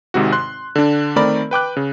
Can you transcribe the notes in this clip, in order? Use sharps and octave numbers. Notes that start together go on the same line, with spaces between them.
G#1 G#2 C3 F#4
C6 F#6
D3 D4
D#3 A3 C4 A#4 D5 B5
B4 G5 D6 F#6
C#3